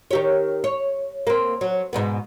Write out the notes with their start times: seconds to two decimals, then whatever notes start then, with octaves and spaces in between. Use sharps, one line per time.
0.11 D#3 G4 C#5
0.64 C#5
1.27 A#3 C4
1.61 F#3
1.93 G#2 B2 B3